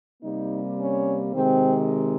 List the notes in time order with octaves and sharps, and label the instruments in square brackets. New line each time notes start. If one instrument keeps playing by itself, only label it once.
[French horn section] C3 G3 A#3 D#4
C#4
C3 D#3 G#3 C4